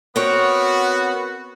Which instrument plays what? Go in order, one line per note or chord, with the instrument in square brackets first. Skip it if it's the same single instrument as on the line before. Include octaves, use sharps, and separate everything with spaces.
[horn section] B3 F#4 [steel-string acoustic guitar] C4 A#4 C#5